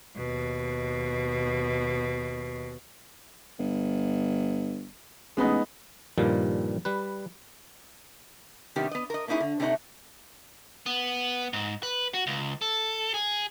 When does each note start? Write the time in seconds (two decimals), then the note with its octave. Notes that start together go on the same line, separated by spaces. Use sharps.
0.16 D#2 B2
3.59 G1
5.37 A1 G#3 B3 D#4
6.18 G2 A#2 D#3 F3 G3
6.85 G3 B4
8.76 C3 D#3 G3 B3 G4
8.91 B3 D#5
9.10 A#4 D#5
9.27 A3 A#3 C#4 D#4 E4 G#4
9.40 D3
9.60 C3 A3 D4 D#4 C5 F#5
10.86 B3
11.53 G#2
11.83 B4
12.14 F#4
12.27 C#2
12.62 A4
13.14 G#4